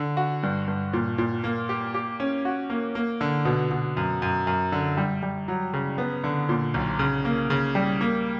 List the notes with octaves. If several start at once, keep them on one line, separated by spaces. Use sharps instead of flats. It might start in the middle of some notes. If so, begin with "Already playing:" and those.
Already playing: D3
F#4
G2
G2
A#2
A#2
A#3
G4
G4
C#4
F#4
A#3
A#3
D3
B2
B2
F#2
F#2
F#2
D3
G3
G3
F#3
C#3
B3
D3
A#2
B1
C#3
A#3
C#3
G3
A#3